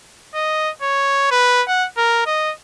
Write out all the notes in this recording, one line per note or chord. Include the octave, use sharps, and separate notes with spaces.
D#5
C#5
B4
F#5
A#4
D#5